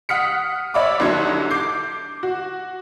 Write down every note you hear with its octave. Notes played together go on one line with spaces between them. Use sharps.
F#5 D#6 F6 B6 C#7
C#5 D5 E5 B5 D6
C2 D3 F#3 D#4 C6 G#6
D6 G6 C7
F#4